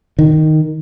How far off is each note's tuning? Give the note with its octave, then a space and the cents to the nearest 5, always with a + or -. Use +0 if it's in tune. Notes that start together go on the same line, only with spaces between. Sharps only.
D#3 +0